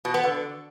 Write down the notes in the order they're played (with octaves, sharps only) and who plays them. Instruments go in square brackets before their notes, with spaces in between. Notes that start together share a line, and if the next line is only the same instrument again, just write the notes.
[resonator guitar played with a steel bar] B2
B3
D3